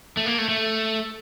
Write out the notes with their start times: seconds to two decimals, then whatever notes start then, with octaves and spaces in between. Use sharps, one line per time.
0.17 A3
0.26 A#3
0.38 A3
0.49 A3